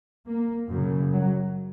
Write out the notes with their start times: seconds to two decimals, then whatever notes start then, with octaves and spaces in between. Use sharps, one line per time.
0.27 A#3
0.69 F#2 C#3
1.13 F#3